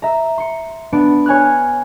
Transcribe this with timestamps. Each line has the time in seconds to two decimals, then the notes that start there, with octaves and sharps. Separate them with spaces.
0.02 E5 A#5
0.38 C6 C#7
0.92 B3 D4 D7
1.26 C#5 G#5 F6 F#6